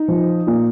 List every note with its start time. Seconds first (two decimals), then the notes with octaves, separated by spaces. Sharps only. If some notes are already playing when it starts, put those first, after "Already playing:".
Already playing: D#4
0.08 F3
0.47 A#2